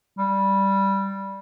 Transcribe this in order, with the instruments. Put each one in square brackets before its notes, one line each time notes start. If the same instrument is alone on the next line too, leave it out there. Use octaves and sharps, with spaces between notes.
[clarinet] G3